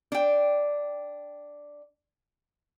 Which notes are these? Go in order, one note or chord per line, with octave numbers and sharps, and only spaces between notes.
D4 G5